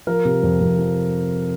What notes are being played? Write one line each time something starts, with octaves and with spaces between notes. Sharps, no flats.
F3 A#4
C3
F2
F2
F3